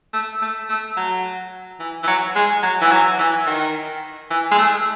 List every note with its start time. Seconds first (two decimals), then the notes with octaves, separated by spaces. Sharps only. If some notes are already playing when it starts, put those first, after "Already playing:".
0.13 A3
0.42 A3
0.69 A3
0.97 F#3
1.80 E3
2.03 E3
2.07 F#3
2.35 G#3
2.63 F#3
2.81 E3
2.91 F#3
3.19 E3
3.46 D#3
4.30 E3
4.51 G#3
4.58 A3